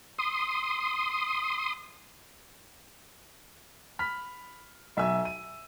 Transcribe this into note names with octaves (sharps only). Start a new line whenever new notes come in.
C6 D#6
B5 F6 B6
B1 E5 G#5 E6
D#7